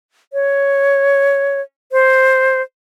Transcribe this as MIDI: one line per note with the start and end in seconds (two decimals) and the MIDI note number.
0.33 1.61 73
1.92 2.62 72